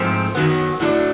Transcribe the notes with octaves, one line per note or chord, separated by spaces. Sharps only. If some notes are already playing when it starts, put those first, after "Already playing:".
Already playing: G#2 F3 A3 C4
F#2 D#3 F#3 B3
A2 F#3 A3 D4